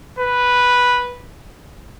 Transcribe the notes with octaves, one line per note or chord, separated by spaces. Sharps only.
B4